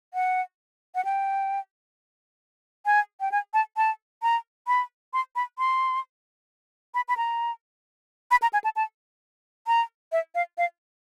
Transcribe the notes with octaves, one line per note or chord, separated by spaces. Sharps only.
F#5
F#5
G5
G#5
G5
G#5
A5
A5
A#5
B5
C6
B5
C6
B5
B5
A#5
B5
A#5
G#5
A5
A5
A#5
E5
F5
F5